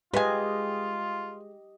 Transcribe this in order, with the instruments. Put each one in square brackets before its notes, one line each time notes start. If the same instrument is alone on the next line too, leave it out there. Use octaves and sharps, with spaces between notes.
[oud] G#3 [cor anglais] F4 [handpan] G4 D#5 [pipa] B4 G#5